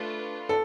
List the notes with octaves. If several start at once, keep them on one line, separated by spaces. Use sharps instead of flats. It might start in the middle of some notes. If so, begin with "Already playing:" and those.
Already playing: A3 D4 F4 B4
A4